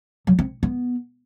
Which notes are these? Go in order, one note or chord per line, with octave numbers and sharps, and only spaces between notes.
F#3
C4
B3